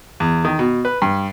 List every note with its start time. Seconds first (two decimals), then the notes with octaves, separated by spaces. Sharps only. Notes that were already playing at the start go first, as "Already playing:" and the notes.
0.20 E2
0.45 D#3
0.59 B2
0.85 B4
1.02 G2